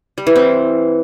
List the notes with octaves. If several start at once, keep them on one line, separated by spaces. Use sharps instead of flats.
G3
E3
C4